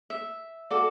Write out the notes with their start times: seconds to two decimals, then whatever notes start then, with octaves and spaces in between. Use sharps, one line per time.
0.10 E5
0.70 F#4 A4 D5